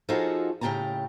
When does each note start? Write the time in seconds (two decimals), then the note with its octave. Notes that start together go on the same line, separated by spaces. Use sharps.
0.09 F3 D#4 F4 F#4 G#4 A4
0.61 A2 C#3 G4 G5 A5 A#5